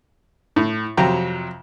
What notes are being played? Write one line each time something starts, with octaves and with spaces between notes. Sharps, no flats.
A2
F2 C3 F#3 G5 A#5